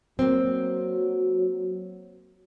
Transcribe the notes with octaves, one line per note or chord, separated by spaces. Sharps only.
F#3 A#3 C4